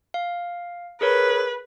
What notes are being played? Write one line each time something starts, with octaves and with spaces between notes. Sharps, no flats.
F5
G#4 A#4 B4 C#5